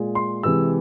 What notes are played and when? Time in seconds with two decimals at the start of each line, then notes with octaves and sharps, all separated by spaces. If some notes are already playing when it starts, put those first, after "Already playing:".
Already playing: A#2 G#3
0.15 C6
0.43 C3 E3 G#3 E6